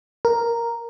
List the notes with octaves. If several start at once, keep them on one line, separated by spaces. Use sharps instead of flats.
A#4